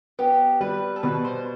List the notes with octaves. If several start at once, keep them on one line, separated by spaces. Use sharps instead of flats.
B3 G4
G3 B4
A4
B2 B4
C5